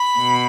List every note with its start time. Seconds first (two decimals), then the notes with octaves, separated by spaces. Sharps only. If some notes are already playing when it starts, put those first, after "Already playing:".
Already playing: B5
0.18 B2